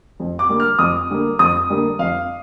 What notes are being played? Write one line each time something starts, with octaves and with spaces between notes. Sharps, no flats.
F2
D6
D3 G3 A#3
F6
F2 D#6
D3 G3 A#3
F2 D#6
D3 G3 A#3
F2 F5